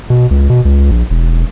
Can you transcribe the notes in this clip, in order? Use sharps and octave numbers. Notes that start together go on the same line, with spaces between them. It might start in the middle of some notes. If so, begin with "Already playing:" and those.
B2
C#2
B2
C#2
A#1
E1